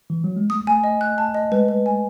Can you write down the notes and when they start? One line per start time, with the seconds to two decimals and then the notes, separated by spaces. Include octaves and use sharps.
0.10 E3
0.24 F#3
0.37 G#3
0.50 A3 D#6
0.67 A3 G#5
0.84 D#5
1.01 F#6
1.18 A5
1.34 D#5
1.51 G#3 B4
1.68 B4
1.86 G#5